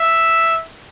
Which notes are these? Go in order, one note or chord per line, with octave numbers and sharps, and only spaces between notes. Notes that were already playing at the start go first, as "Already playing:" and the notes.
Already playing: E5